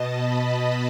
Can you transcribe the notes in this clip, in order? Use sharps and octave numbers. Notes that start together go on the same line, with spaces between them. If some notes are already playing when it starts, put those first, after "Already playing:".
Already playing: B2 D#5 A5
B5